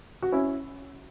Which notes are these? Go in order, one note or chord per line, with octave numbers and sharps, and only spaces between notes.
F#4
C#4 E4